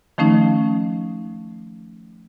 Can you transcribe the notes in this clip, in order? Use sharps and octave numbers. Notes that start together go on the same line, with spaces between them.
D#3 F3 A3 C#4 D#4